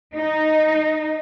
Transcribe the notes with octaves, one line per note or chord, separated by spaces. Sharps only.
D#4